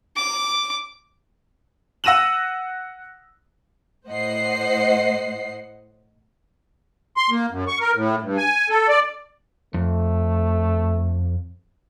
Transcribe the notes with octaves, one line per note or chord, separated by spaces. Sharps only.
D6
F#5 E6 A#6 D#7 E7 F#7
A2 C5 D#5 F#5 C7
C6
A#3
F#2
C#6
A#4
A2
G2
G#5
A4
D5
F2 A3